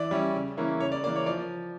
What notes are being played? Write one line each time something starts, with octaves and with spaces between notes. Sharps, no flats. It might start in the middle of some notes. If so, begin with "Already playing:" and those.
Already playing: E3 D5
G3 C#4 E4
C#3
E3 A#3 C#4 E4
C#3 C#5
D5
E3 A#3 D5
C#5
F3 D5